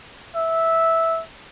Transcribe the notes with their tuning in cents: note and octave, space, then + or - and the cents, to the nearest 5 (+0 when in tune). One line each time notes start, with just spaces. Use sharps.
E5 -10